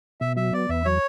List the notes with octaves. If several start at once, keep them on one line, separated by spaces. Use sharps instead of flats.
B2 E5
F#3 E5
B3 D5
E2 E5
F#3 C#5